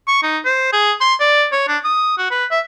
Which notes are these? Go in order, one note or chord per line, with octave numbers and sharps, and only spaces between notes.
C#6
D#4
C5
G#4
C6
D5
C#5
D4
D#6
F#4
B4
E5